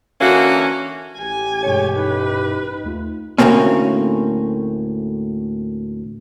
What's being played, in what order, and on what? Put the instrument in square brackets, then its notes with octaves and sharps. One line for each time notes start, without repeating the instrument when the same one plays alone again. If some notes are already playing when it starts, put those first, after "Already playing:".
[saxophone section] D3 E3 A#3 C#4 F#4
[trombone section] A1 G4 [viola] G#5
[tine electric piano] G2 B2 C#7 [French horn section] D3 G#3 C#5
[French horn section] D#4 [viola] B4
[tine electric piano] D#2 A3 F4
[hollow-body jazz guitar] D2 A2 A#3 C4 C#4